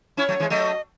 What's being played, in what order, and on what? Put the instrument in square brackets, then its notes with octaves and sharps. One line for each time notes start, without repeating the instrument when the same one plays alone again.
[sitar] C#4 E4 [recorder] C#5
[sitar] F#3 A3
E3 G#3
[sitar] F#3 A3 [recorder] D#5